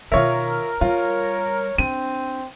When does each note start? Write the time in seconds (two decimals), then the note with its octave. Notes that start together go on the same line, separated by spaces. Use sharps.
0.12 B2 D#3 F4 A#4 C#5 E5
0.81 G3 F4 C#5
1.78 C4 D4 D#7